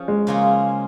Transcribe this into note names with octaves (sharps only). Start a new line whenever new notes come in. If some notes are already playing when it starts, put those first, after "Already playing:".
Already playing: F3 C#4 G#4
G#3
C#3 A#3 F4 G#4